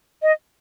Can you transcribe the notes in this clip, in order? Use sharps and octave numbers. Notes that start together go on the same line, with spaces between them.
D#5